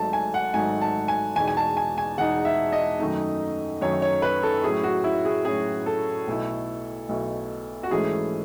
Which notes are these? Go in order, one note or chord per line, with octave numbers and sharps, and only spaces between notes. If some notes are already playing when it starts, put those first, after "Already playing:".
Already playing: G#1 G#2 F#3 A3 D#4 A5
G#5
F#5
G#1 G#2 F#3 A3 D#4 G#5
A5
G#5
E2 B2 G#3 D#4 G#5
G#5
A5
G#5
G#5
E2 B2 G#3 D#4 F#5
E5
D#5
F#2 D#3 A3 D#4
F#2 D#3 A3 D#4 C#5
C#5
B4
A4
A2 F#3 C#4 E4 G#4
F#4
E4
G#4
A2 F#3 C#4 E4 G#4
A4
B1 B2 A3 E4
B1 B2 A3 E4
F#4
G#2 E3 A3 C#4 E4 G#4